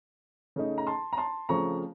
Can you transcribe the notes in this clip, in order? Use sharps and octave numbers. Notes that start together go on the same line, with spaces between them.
C#3 A3 D#4
A#5
A5 C6
A#5
A5 C6
C#3 F3 A3 C4 A#5 C#6